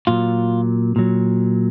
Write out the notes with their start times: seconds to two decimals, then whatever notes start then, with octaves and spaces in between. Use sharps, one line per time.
0.07 A#2 F#3 F4
0.96 A#2 F#3